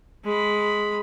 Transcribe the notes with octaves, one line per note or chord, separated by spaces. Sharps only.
G#3 B5